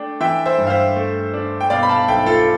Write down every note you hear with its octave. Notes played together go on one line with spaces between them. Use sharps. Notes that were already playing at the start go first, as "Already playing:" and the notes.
Already playing: A3 D4 G5
E3 E5 G5
C5 E5
G2
F5
C5 E5
A3
D4
G5
B2 D5 F5
B5
F5 A5
B1 E5 G5
F4 A4